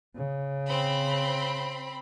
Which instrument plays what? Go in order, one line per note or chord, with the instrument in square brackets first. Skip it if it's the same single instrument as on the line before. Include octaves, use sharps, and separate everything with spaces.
[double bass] C#3
[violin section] C4 B5